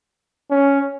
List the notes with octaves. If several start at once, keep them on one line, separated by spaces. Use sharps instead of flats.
C#4